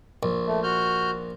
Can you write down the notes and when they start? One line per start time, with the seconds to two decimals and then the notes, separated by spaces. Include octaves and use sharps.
0.23 A#1
0.47 A3
0.63 F#4 F6 G6